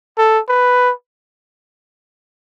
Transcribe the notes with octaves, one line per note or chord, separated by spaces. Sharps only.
A4
B4